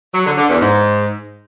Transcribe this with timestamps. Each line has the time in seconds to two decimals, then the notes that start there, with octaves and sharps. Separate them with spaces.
0.14 F#3
0.26 D3
0.38 D3
0.50 E2
0.61 G#2